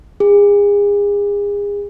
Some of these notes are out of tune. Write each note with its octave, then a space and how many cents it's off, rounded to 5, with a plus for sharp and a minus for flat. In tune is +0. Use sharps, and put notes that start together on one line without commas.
G#4 -35